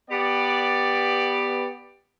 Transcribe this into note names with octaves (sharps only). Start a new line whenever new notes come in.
B3 G4 D5